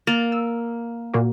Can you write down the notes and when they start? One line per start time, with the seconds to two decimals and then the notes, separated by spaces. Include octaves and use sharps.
0.07 A#3 A6
0.32 E6
1.14 A#2 A#3 F#4